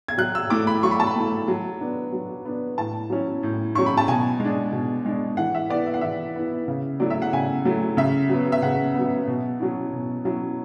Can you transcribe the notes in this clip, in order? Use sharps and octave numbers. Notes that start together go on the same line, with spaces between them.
G#6
F#3 F#6
E6
A3 E4 D6
B5
F#3 C#6
B5
A5
B5
A3 E4
F#3
B3 D4
F#3
B3 D4
A2 A5
F#3 C#4 E4
A2
F#3 C#4 E4 C#6
B5
A5
B2 G#5
G#3 D4
B2
G#3 D4
E3 F#5
E5
B3 E4 D5
E5
F#5
E3 E5
B3 E4
C#3
F#3 A3 E4 D5
E5
F#5
C#3 G#5
F#3 A3 E4
C#3 E5
F#3 B3
E5
C#3 F#5
F#3 B3
B2
F#3 C#4 E4
B2
F#3 C#4 E4